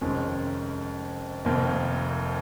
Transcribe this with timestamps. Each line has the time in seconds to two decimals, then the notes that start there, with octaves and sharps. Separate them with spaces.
0.01 F1 F2 D#3 G#3 C#4
1.45 F1 F2 D#3 A#3